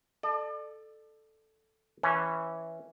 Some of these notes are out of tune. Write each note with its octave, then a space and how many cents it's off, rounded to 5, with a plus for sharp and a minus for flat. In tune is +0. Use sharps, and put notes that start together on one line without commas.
A4 +0 D5 +35
E3 +0 C#4 -10